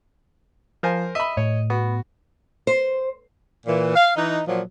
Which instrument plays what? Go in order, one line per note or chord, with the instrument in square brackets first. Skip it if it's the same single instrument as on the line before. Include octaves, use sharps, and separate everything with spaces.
[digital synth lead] F3 [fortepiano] A#4 C5 G#5
[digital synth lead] D#5 [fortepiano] E5 B5
[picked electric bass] A2 [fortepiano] C#5
[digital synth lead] B3 [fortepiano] F#4
[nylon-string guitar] C5
[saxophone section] A#2 E3
F5
E3 D#4
A#2 F3 F#3